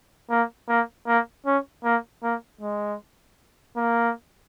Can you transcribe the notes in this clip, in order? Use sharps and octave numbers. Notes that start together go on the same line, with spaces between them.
A#3
A#3
A#3
C#4
A#3
A#3
G#3
A#3